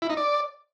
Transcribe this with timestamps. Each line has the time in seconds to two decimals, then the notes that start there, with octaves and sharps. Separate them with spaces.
0.02 E4
0.10 D#4
0.17 D5